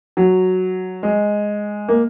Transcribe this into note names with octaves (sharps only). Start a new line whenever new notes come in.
F#3
G#3
A#3